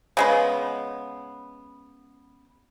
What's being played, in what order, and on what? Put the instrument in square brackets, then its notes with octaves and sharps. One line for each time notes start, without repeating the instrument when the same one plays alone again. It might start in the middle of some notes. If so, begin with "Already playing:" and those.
[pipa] C#3 G#3 B3